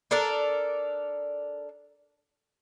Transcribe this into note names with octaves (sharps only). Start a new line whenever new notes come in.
D4 A4 A#4 D5